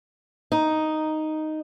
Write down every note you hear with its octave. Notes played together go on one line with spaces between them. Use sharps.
D#4